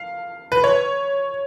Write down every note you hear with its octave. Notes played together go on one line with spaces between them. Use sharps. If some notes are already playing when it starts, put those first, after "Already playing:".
Already playing: F5
B4
C#5